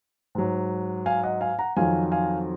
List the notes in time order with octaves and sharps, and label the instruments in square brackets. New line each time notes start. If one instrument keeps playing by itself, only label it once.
[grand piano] G#2 F#3
F5 G#5
D#5 F#5
F5 G#5
F#5 A#5
F2 D#3 F#3 F5 G#5
F5 G#5